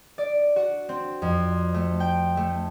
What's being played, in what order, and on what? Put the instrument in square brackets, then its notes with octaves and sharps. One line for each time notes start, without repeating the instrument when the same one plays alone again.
[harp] D5
F#4
C4
F2
A3
G5
A3